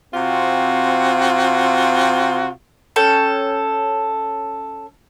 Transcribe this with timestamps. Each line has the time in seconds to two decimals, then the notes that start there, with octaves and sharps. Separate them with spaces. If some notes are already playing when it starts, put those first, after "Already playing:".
0.14 C3 C4 F4 F#4
2.96 C#4 A4 G5